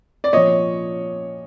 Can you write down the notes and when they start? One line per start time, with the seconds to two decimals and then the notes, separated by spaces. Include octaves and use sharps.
0.24 D5
0.33 A#2 F3 C#5 D#5